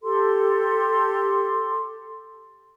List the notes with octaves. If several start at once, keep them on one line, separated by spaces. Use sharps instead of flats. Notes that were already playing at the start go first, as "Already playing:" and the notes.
G4 A4 C6